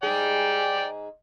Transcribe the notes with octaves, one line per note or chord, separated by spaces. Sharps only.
G#2 G#4 D5 G5